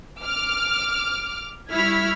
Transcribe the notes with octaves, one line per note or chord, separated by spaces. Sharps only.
D6 F6
G3 E4 C#6 F6 G#6 B6